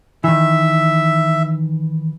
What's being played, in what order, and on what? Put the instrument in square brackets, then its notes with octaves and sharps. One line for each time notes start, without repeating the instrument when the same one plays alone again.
[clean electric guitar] D#3 E3 [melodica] E5